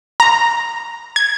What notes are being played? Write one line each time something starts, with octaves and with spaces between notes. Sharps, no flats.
A#5
G#6